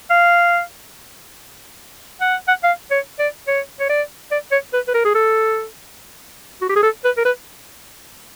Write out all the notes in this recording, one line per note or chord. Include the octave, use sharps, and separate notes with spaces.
F5
F#5
F#5
F5
C#5
D5
C#5
C#5
D5
D5
C#5
B4
B4
A#4
G#4
A4
F#4
G4
G#4
A4
B4
A#4
B4